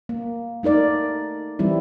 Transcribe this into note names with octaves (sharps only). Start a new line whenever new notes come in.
A#3
A3 D#4 A#4 D5
E3 G3 C4 E4